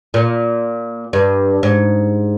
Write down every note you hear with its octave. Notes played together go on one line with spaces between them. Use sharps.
A#2
G2
G#2